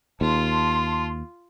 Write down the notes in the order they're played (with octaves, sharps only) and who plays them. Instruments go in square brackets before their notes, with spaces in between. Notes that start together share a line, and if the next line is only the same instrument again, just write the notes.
[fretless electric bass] D#2 [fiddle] F4 [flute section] A5 C6